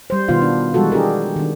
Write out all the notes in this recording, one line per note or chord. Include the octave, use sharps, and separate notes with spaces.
G3 C5
B2 D#3 B3 F4 F5
D4
E3 G3 G#3 F#4 A4
D4 G4 G#4 A#4
D#3 D4